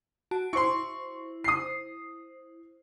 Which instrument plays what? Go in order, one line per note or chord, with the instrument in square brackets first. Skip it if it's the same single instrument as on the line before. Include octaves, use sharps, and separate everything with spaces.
[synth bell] F#4 A5 D7
[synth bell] E4 C5 [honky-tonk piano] C6 C#6
[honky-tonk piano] D#6 C7